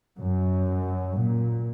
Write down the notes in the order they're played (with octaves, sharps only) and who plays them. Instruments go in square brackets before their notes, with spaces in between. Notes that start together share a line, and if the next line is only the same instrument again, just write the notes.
[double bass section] F#2
A#2